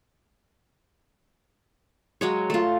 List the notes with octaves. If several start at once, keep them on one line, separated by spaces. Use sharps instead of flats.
F#3 G#3 C#5
A3 F4